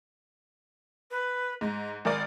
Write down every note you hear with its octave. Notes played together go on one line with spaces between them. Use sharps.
B4
G#2 A#5
G#1 A#4 D5 G#5